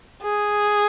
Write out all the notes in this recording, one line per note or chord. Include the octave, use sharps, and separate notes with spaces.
G#4